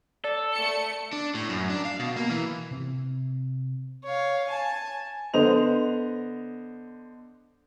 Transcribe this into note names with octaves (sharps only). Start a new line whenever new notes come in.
A4 D5
A3 C#7
D4
A2
F#2
D4
F5
B2
A#3
E3
C3 C4
C#5 F5
G#5 A5
D3 B3 C5 D#5 F7